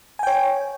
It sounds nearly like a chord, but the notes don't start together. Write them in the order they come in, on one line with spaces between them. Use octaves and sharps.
G#5 G5 C#5